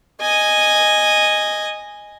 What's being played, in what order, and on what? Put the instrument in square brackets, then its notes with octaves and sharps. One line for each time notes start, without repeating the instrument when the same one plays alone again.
[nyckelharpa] D#5 G#5